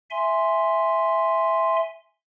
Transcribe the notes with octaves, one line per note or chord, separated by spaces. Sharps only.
E5 G#5 C6